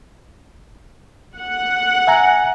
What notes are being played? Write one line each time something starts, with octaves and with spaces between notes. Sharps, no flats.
F#5
E5 G#5 A#5